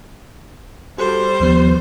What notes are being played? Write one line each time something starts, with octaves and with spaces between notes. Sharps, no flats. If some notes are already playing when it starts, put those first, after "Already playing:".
G3 F#4 A4 C5
D#2 F3 B3